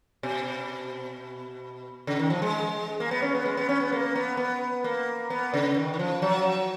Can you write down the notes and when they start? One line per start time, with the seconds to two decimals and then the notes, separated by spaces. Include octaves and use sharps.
0.23 B2
2.07 C#3
2.19 D#3
2.30 F3
2.42 G#3
3.00 A#3
3.11 B3
3.22 C#4
3.35 B3
3.45 G#3
3.57 B3
3.69 C#4
3.80 B3
3.92 A#3
4.15 B3
4.37 B3
4.84 A#3
5.30 B3
5.54 C#3
5.77 D#3
5.94 D#3
5.99 F3
6.22 F#3